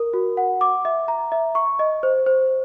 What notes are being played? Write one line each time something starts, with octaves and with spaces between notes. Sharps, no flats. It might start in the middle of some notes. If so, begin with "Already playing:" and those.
Already playing: A#4
F#4
F#5
D6
E5
A#5
E5
C#6
D#5
C5
C5